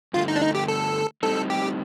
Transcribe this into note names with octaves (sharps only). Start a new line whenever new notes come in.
G2 D3 A3 F4
D#4
D4
D#4
G4
A4
A2 G3 C4 D#4 A4
G4